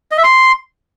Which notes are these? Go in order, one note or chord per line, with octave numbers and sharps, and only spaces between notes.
D#5
E5
C6